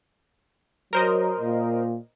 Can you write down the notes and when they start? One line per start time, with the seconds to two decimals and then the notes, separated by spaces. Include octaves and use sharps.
0.93 F#3 A#4 C5 D#5
1.40 A#2